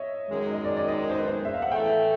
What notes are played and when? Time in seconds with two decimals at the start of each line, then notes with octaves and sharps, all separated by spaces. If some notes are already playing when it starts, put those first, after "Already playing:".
Already playing: C#5 D#5 E5
0.29 F#2 D#3 G#3
0.53 D#5
0.65 D5
0.77 D5
0.88 D#5
1.10 C5
1.18 B4
1.28 C5
1.45 E5
1.54 F5
1.62 F#5
1.72 A2 E3 A3 G5